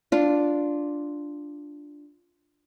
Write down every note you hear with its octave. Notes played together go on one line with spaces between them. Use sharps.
D4 F4